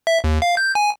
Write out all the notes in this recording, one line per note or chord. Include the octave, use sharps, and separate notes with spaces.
E5
D#2
F5
G6
G#5